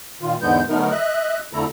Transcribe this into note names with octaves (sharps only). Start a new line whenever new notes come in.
A#2 D#3 F4
E2 G#2 D3 G#3 B3 G6
D3 F#3 A3 B3 D#4 A#4
D#5 E5 F#6
F2 D3 A3 E4 A4 A#5